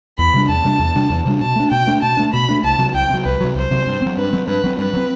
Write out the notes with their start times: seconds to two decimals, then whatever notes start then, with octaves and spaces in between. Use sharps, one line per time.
0.18 E2 B5
0.34 C3 G3 D4
0.49 E2 A5
0.64 C3 G3 D4
0.79 E2
0.95 C3 G3 D4
1.10 E2
1.25 C3 G3 D4
1.41 B2 A5
1.56 A3 D4
1.71 B2 G5
1.87 A3 D4
2.02 B2 A5
2.17 A3 D4
2.33 B2 B5
2.49 A3 D4
2.63 C2 A5
2.78 C3 F#3
2.94 C2 G5
3.10 C3 F#3
3.25 C2 B4
3.41 C3 F#3
3.55 C2 C5
3.71 C3 F#3
3.87 G2
4.02 F#3 C4
4.17 G2 B4
4.33 F#3 C4
4.48 G2 B4
4.64 F#3 C4
4.78 G2 B4
4.94 F#3 C4